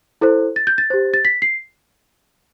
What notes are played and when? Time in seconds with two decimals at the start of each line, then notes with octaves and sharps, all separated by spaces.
0.21 E4 A4 C5
0.56 A6
0.67 G6
0.78 A6
0.90 G4 C5
1.14 A6
1.25 B6
1.42 C7